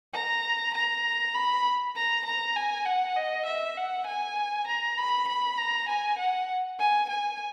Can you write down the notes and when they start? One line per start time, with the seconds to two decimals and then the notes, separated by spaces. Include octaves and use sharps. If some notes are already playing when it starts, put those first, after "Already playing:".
0.13 A#5
0.74 A#5
1.35 B5
1.96 A#5
2.26 A#5
2.56 G#5
2.86 F#5
3.17 D#5
3.46 E5
3.77 F#5
4.07 G#5
4.67 A#5
4.98 B5
5.28 B5
5.58 A#5
5.89 G#5
6.19 F#5
6.79 G#5
7.10 G#5